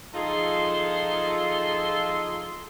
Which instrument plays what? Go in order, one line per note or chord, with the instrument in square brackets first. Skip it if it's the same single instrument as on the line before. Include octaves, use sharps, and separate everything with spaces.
[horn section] F3 D#4 F4 G#4 A4 C6